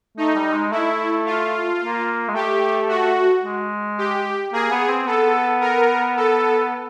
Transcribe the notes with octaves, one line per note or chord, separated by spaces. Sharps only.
A3 D#4
G3
G#3
A3 E4
F4
A#3
G#3
A3 G4
F#4
G#3
G4
A#3 G#4
B3
C4
B3 A4
A#4
A4